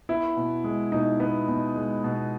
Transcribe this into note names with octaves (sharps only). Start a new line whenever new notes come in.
B3 E4
B2
G#3
B2 D#4
B3
B2
G#3
B2